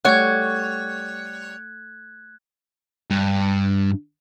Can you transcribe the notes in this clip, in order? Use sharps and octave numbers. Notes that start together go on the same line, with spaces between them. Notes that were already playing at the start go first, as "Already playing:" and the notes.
G3 A3 C#5 F#5 F#6 G#6
G2